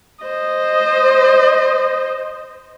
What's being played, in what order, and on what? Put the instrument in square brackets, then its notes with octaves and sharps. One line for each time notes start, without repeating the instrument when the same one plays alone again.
[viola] C5 D#5